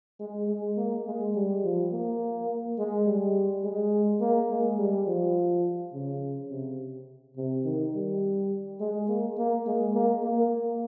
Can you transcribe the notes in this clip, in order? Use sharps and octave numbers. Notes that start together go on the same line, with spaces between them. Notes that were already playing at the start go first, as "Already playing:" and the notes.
G#3
G#3
A#3
G#3
G3
F3
A#3
G#3
G3
G#3
A#3
G#3
G3
F3
C#3
C3
C3
D#3
G3
G#3
A#3
A#3
G#3
A#3
A#3